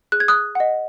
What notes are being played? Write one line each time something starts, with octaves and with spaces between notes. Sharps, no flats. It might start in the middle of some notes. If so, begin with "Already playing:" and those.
G#4 F#6
G#6
D#6 F#6
D#5 F#5